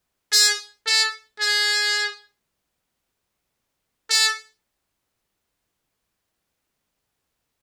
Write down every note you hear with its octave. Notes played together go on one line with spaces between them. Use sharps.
G#4
A4
G#4
A4